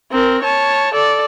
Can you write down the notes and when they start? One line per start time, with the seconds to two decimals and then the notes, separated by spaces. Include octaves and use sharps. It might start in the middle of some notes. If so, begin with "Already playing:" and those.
0.11 C4 A#4
0.43 C#5 A5
0.93 A4 D5